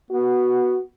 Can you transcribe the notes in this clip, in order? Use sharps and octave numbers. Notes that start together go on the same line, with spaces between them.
B3 F#4